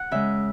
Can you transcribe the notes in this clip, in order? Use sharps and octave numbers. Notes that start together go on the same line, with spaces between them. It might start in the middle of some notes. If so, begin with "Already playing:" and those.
Already playing: F#5
C#3 G#3 E5